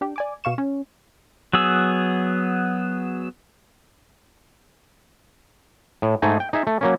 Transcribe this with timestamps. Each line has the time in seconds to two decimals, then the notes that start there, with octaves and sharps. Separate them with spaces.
0.01 D4 G4
0.16 D5 G#5 D6
0.44 B2 F5 C#6 E7
0.58 C#4
1.53 F#3 B3 G#4 E6
6.02 A2
6.22 G#2 A3 D#4 G#4
6.40 G5
6.53 D#4 G#4 E5
6.67 A3
6.81 F#3 A#3 C#4